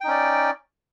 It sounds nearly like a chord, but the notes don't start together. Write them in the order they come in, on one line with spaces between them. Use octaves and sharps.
G5 D#4 C#4 D5